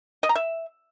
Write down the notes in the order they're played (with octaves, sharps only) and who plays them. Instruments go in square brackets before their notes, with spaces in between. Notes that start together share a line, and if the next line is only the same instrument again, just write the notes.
[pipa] D#5
A#5
E5